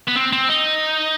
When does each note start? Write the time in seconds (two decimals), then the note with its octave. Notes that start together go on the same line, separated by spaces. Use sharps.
0.08 B3
0.16 C4
0.33 C4
0.49 D#4